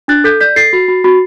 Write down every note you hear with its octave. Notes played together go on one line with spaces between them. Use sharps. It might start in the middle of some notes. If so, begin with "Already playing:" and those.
D4 F#6 A6
A4 G6 B6
D5 G6 B6
A4 A6 C7
F#4
F#4
F#4